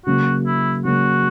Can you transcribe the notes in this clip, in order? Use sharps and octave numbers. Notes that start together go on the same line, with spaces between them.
C#3 F#3 A#3 F#4
E4
C#3 F#3 A#3 F#4